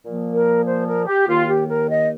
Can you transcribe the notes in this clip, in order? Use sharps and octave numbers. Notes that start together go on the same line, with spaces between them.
A#2 F3 A#3
A#4
C5
A#4
G4
D#2 D#3 A#3 F4
G4
A#4
D#5